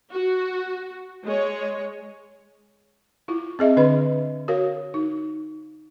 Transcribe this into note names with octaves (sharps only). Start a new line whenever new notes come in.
F#4
G#3 C#5
E4 F4
C4 G#4 D#5 E5
D3 D4 B4 D#5 B5
F#4 A#4 C#5 F5
D#4